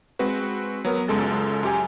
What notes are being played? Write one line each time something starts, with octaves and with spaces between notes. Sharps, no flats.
G#3 C4 F#4 B4
F#3 B3 A#4
C#2 F#2 G#3 A4 A6
F#2 G4 G#5